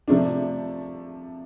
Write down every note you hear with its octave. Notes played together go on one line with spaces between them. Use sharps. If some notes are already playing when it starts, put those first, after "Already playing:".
C3 F3 A3 D4